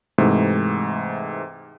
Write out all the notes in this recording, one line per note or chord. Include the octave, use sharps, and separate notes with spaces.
G#2 C3 E3 A3